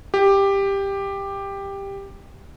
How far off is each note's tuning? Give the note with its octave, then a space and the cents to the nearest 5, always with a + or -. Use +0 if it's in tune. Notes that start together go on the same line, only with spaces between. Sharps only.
G4 +10